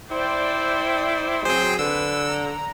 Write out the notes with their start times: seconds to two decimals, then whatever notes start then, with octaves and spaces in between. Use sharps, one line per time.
0.11 E4 C5 D5 G5
1.45 F#3 C4 G#4 C5 G5
1.79 D3 B4 E6
2.29 A#5